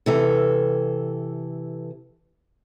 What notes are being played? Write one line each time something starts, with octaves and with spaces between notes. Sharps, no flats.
C3 E3 A4